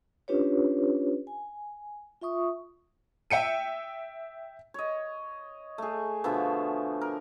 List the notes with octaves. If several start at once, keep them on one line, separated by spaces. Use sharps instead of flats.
C#4 D4 F4 G4 B4 C#5
G#5
F4 E5 C#6 D#6
E5 G5 C#7 D#7
C#5 D#5
A3 G#4
B2 D3 F3 E5
A#4